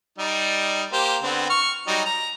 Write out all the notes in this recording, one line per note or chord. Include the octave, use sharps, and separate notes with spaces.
G3 D#4 D5
A#3 G4 C5
D3 B3 C4
C#6 F6
F#3 G3 D#4
A#5